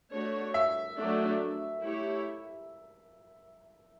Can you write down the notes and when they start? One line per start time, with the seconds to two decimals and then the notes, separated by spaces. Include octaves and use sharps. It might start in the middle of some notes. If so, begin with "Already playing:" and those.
0.12 A3 D4 F#4 C#5
0.54 E5
0.98 F#3 A3 D4
1.83 A3 E4 G4 C#5